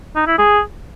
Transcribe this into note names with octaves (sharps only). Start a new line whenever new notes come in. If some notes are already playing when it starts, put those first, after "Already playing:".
D#4
E4
G#4